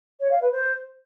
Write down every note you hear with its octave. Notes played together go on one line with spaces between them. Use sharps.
C#5
F5
B4
C5